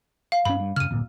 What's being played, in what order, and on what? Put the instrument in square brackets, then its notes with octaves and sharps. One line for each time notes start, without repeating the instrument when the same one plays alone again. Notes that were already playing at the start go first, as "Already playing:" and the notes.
[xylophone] F5
[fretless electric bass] G2 C#4 [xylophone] B5
[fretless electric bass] G2
[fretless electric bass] F#2 C#3 [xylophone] F6 D#7
[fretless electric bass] D1 G1 A#2